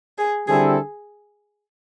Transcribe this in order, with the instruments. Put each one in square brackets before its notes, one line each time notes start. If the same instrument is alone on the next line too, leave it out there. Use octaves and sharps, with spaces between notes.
[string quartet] G#4
[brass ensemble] D3 G3 C4 E4 A4 [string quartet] G#4